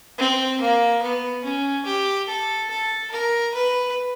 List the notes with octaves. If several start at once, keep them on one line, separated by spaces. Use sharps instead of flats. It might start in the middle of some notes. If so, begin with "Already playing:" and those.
C4
A#3
B3
C#4
G4
A4
A4
A#4
B4